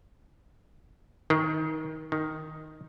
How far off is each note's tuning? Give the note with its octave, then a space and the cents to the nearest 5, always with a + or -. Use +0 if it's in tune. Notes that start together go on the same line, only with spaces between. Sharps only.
D#3 +20
D#3 +0